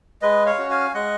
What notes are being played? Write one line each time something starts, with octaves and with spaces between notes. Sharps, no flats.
G#3 B4 D#5
C#5 F5
C#4 F#4
F5 G#5
G#3 D#5 F#5